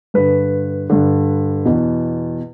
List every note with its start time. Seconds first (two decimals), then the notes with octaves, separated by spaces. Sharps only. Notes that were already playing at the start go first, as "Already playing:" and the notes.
0.14 G2 D3 B4
0.90 G2 D3
1.66 E2 B2